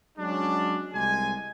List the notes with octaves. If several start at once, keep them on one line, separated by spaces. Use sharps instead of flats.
F#3 G#3 C#4 D4
C2 G#3 G#4 G#5